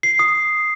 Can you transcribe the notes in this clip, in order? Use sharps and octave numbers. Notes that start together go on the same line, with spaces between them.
C7
D#6